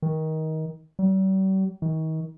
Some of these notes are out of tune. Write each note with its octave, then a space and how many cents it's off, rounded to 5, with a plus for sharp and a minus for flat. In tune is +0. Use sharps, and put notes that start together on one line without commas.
D#3 +20
G3 -45
D#3 +35